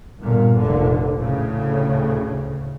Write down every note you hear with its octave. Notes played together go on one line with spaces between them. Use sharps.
G1 A#2
F1 A#1 D3
D2 A2 C#3